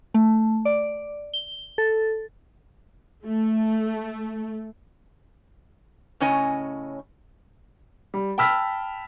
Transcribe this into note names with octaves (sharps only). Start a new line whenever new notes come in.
A3
D5
G7
A4
A3
A2 C#3 C#4 C#5 D#5 G#5
G3
G5 A5 B5 E6 F6 B6